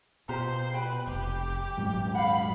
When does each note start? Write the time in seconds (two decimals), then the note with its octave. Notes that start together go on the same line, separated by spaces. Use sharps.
0.29 B2 F4 G4 C5 A#5
0.74 B4 G5 B5
1.07 F1 G4
1.78 D#1 G#2 F#3
2.15 F5 F#5 B5